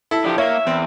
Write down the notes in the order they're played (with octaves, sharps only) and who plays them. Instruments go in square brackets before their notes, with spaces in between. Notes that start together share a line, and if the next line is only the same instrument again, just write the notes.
[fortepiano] E4 A4
[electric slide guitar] F3 D4 [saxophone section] G4
[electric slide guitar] A#3 [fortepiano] C#5 [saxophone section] E5
[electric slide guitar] E2 [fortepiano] C4